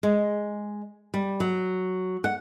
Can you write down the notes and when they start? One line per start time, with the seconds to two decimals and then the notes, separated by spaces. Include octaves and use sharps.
0.03 G#3
1.14 G3
1.40 F#3
2.24 F#5